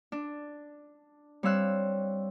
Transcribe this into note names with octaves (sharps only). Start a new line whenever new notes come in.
D4
G3 C4 C#5 F5 E6 F#6